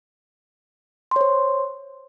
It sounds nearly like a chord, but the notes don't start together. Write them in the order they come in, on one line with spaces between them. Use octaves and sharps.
C6 C#5 C5